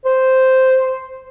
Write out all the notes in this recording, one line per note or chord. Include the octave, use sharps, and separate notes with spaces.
C5